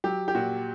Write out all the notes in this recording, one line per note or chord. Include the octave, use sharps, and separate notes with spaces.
F#3 G4
G4
A#2 F#4